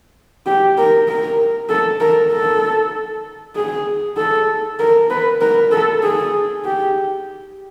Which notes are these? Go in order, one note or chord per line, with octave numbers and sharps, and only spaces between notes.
G4
A#4
A#4
A4
A#4
A4
G#4
A4
A#4
B4
A#4
A4
G#4
G4